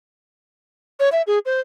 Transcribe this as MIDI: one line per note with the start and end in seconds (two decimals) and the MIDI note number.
1.00 1.09 73
1.12 1.22 76
1.27 1.39 68
1.46 1.60 72